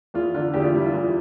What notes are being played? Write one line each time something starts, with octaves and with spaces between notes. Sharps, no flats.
E2 F4
D3 F4
E2 G4
F4
G3 E4
F4
E2